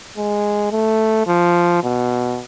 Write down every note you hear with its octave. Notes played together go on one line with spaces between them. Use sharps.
G#3
A3
F3
B2